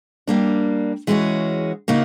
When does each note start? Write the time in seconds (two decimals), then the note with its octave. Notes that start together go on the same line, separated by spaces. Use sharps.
0.27 G3 A#3 D4
1.07 E3 G#3 C#4 F#4
1.88 C#3 A#3 D#4 F#4